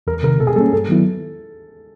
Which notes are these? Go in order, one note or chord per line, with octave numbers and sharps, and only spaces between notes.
E2 A#4
C3 D#3 A#4
B2 A4
G#4
G3 A#3 C#4 A4
G2 A4
D#3 F#3 B3 E4